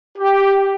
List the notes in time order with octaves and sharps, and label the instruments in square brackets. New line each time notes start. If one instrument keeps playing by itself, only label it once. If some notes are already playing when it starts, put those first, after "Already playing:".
[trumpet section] G4